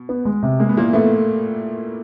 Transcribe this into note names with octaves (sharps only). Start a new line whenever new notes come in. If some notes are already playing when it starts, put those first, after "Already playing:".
Already playing: B2
B3
G#3
C3
G#3 A#3
B3
A#2 E3 A#3
A2 A3 B3